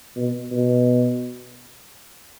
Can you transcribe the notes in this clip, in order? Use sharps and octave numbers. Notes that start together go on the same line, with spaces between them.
B2
B2